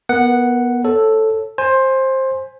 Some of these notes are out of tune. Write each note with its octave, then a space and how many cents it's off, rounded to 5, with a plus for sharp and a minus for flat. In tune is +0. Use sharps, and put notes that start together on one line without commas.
B3 -20 A#4 +0 F#5 +0
A4 +0 C#5 -20
C5 +15 G#5 +0